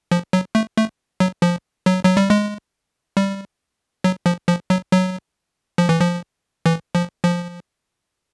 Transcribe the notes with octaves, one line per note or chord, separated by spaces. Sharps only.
F3
F#3
A3
A3
F#3
F3
F#3
F#3
G3
G#3
G3
F#3
F3
F3
F#3
F#3
F3
E3
F3
E3
F3
F3